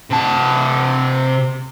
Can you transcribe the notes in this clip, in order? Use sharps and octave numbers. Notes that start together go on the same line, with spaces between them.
C3 A5